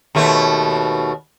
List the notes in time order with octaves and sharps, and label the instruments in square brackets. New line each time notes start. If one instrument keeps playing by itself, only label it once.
[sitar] D#2 B2 A3